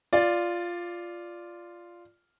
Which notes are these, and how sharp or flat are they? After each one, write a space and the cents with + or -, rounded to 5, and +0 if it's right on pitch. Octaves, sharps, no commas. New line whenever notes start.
F4 -5 D5 +0